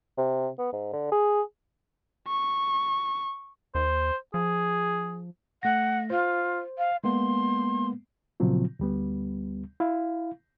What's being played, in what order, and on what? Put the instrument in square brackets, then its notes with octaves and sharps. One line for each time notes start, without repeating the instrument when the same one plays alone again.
[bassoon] C3
B3
G#2
D3
G#4
[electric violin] C#6
[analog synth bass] D#2 [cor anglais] C5
[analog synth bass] F3 [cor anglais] G#4
[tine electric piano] A3 A#6 [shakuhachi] F#5
[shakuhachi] F4 [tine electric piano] C5
[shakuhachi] F5
[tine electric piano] G#3 A#3 B3 [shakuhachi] C6
[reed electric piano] A#2 C#3 F3 F#3 C4 F4
D2 G3 B3
E4 F5